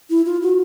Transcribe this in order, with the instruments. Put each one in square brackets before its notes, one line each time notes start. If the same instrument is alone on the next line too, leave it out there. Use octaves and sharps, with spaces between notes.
[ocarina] E4
F4
F#4